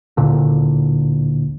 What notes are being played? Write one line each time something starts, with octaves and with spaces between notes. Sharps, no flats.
A1 D2 A#2 D3